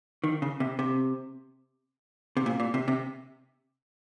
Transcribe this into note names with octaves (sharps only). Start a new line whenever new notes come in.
D#3
C#3
C3
C3
C3
A#2
A#2
C3
C3